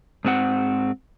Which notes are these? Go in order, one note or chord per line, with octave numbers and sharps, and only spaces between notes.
G#2 C4 F#5